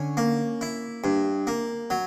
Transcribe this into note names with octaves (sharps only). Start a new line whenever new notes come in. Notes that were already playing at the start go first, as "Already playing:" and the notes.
Already playing: D3 C#4
A#3
E4
G2
A#3
F#3